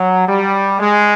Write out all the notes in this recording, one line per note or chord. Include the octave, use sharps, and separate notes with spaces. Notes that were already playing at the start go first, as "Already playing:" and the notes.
Already playing: F#3
G3
G#3